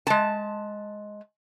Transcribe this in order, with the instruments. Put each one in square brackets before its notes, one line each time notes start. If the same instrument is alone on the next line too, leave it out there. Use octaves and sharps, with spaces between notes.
[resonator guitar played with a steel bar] G#3 A5